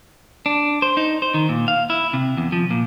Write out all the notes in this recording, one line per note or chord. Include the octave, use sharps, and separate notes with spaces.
D4
C5
D#4
C5
D#3
A#2
F5
E4
C3
E2
F3
A#2